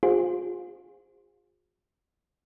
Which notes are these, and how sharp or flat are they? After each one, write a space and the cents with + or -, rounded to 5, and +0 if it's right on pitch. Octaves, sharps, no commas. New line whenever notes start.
F4 +35 G#4 -35 C5 +0